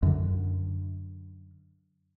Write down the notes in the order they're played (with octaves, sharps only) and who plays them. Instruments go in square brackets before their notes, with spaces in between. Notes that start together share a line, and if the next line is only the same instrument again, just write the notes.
[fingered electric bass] F#2 D3